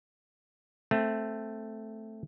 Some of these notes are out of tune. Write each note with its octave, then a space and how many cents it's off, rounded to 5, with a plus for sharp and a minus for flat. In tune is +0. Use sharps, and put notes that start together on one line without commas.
A3 +0 C4 +0